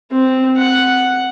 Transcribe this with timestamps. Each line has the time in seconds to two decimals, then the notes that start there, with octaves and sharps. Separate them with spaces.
0.11 C4
0.58 F#5